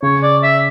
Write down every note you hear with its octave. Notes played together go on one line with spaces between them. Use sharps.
C#3 C#5
D5
E5